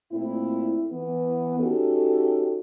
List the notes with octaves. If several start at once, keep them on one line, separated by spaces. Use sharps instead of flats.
A#2 A3 C4 E4
E3 B3
C#4 D#4 F#4 G4 A4